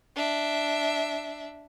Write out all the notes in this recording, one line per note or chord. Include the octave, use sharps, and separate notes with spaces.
D4 E5